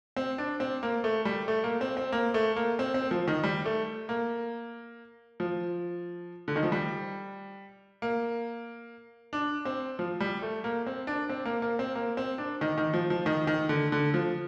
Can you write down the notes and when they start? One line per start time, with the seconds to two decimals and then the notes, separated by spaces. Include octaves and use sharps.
0.16 C4
0.38 D4
0.60 C4
0.83 A#3
1.04 A3
1.25 G3
1.48 A3
1.64 A#3
1.81 C4
1.97 C4
2.12 A#3
2.34 A3
2.56 A#3
2.79 C4
2.94 C4
3.11 F3
3.28 D#3
3.43 G3
3.65 A3
4.09 A#3
5.40 F3
6.48 D3
6.56 D#3
6.63 F3
6.72 G3
8.02 A#3
9.33 D4
9.65 C4
9.99 F3
10.20 G3
10.42 A3
10.64 A#3
10.86 C4
11.07 D4
11.29 C4
11.45 A#3
11.62 A#3
11.79 C4
11.95 A#3
12.17 C4
12.38 D4
12.61 D#3
12.78 D#3
12.94 F3
13.10 F3
13.26 D#3
13.47 D#3
13.69 D3
13.92 D3
14.14 F3